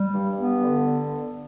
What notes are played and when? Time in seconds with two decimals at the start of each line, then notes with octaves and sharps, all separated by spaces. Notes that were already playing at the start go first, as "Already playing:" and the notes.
Already playing: G3
0.13 G2
0.39 B3
0.63 D3